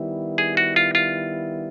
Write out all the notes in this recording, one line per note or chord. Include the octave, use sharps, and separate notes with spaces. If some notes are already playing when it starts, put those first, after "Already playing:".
Already playing: D#3 G3 B3 E4
G#4
F#4
F4
F4